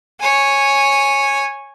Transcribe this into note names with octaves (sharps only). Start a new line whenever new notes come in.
C#5 G#5